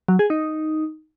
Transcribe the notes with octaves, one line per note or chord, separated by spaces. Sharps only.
F#3
G#4
D#4